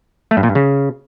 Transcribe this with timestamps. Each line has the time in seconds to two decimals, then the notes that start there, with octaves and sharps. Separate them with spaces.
0.31 A3
0.37 G2
0.43 A#2
0.49 G2
0.55 C#3